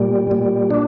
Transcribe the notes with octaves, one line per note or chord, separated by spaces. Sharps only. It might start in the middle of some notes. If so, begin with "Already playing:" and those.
Already playing: A#2 G3
A#2
D4